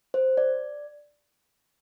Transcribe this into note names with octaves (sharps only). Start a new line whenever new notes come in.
C5
D5